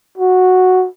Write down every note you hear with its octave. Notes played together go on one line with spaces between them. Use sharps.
F#4